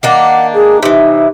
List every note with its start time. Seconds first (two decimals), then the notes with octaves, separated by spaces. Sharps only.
0.03 D#3 A#3 D4 F#5
0.54 G#4
0.83 C3 E3 D#4